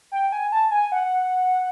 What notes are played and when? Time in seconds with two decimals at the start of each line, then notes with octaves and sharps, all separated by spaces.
0.12 G5
0.32 G#5
0.52 A5
0.71 G#5
0.92 F#5